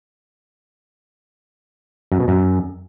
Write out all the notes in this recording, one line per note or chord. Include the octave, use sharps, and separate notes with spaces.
F#2
B2
F#2